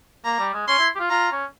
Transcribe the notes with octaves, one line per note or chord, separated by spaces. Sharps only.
A#3 A#5
G3
G#3
C#4 C6
E4
G4
F4
F4 A#5
C#4